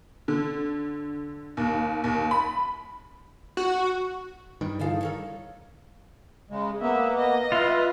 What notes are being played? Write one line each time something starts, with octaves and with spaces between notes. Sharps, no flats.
D3
D#2
D#2
B5
F#4
G2 D#3
D3 E3 G#4 A4 F5
A4 A#4 C#5
C#3 G#3
A#3 B3 E5
D#5
F4 B4 E5